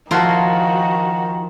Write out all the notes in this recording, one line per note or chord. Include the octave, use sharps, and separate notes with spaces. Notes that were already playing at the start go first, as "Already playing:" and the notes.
D#3 F3 E4 F#4 A#4 B4 A5 C6